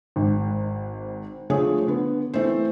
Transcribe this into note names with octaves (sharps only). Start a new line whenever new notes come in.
G#1 G#2
D3 F3 A3 G#4 C#5
D3 B3
E3 A3 C4 C5